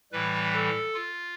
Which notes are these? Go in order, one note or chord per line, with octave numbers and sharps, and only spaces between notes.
A2 E3 G3 B4
A4
F4